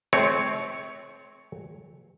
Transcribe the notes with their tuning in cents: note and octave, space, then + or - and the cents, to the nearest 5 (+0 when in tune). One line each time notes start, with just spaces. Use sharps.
A3 -40 C4 +0 C#5 +0